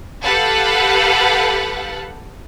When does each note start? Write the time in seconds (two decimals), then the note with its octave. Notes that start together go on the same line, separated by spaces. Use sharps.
0.23 G4 A4 B4 F5 F#5